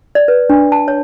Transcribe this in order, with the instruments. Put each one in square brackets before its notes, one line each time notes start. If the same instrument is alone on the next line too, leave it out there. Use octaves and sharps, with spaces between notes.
[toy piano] D5
B4
D4
A5
C#5